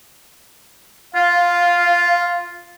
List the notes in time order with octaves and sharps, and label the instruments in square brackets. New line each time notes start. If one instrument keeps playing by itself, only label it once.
[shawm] F4 [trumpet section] F5